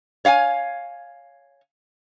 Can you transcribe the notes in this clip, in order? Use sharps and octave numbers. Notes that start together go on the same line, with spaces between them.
C#5 F5 F#5 G#5